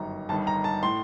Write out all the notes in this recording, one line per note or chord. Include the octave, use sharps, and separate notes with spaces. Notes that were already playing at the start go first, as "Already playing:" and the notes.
Already playing: G1 F#2 D#3 A#5
G1 G2 D#3 A5
A#5
A5
A2 C6